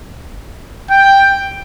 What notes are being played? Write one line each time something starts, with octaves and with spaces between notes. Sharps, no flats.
G5